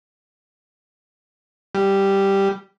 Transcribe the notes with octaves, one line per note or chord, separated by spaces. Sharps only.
G3